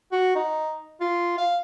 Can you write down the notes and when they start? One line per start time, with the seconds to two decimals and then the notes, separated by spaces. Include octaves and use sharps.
0.12 F#4
0.35 D#4
1.01 F4
1.38 F5